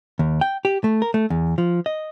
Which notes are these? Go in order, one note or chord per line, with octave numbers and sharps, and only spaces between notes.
D#2
G5
G4
A3
A#4
A3
E2
F3
D#5